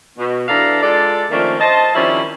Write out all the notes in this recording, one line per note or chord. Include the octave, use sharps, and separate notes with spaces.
B2
E3 D4 A4 D5 F5 A#5
G#3 F4 A4 D5
D#3 F3 A3 A#3 C#4 D4
C5 D#5 A5
D#3 F3 G3 C4 C#4 E4